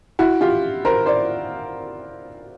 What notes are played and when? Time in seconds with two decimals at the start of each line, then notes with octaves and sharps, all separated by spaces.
0.19 E4 F#4
0.41 F4 G4
0.85 A#4 C5
1.06 C5 D5